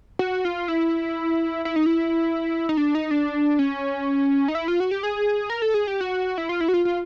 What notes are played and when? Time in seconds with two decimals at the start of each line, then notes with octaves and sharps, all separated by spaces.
0.19 F#4
0.45 F4
0.68 E4
1.65 E4
1.76 D#4
1.86 E4
2.69 D#4
2.77 D4
2.95 D#4
3.11 D4
3.59 C#4
4.48 D#4
4.55 E4
4.68 F4
4.80 F#4
4.91 G4
5.03 G#4
5.50 A#4
5.62 A4
5.74 G#4
5.87 G4
6.01 F#4
6.38 E4
6.49 F4
6.61 E4
6.68 F#4
6.74 F4
6.85 F4